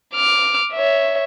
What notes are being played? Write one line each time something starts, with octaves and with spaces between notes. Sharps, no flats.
D6 F6
C#5 E5